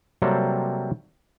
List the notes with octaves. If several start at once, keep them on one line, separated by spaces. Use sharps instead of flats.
C3 F#3 G3 A#3 C4 A4